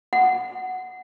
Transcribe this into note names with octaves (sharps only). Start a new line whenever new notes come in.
F#5